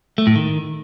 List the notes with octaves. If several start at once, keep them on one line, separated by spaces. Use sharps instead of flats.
A3
A2
D#3